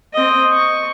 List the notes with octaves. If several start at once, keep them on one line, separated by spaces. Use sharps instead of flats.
C4 D#5
C#6